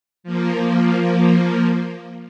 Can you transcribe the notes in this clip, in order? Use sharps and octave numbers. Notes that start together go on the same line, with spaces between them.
F3 A#3